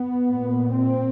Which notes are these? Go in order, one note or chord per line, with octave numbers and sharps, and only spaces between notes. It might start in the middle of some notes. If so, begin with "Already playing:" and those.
Already playing: B3
A#2
C4